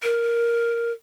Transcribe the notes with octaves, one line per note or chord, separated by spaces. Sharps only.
A#4